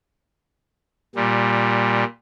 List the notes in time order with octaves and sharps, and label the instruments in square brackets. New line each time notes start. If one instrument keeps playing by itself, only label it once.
[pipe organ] A#2 G3